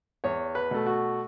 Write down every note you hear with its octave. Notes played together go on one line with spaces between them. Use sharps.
E2 C#5
B4
B2 A3
F#4